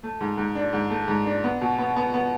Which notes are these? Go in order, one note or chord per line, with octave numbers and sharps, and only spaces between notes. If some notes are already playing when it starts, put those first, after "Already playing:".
A3
G#2
G#2
D4
G#2
A3
G#2
D4
B3
B2
B3
B3
B3